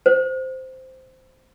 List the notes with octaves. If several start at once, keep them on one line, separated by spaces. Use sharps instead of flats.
C5